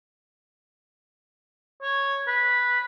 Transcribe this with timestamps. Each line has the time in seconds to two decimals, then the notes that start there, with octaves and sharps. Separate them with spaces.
1.82 C#5
2.27 B4